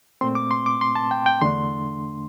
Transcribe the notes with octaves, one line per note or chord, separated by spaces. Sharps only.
A#2 A3 C4 C6
D6
C6
D6
C6
A5
G5
G5
E2 D3 A3 D4 C6